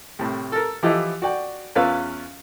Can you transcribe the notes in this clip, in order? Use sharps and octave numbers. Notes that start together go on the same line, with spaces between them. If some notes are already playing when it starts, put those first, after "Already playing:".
C2 A2
A4 A#4
E3 F3 E4 G4 A4 D#5
F#4 D5 G5
E2 C#4 F4 B4 F5 E6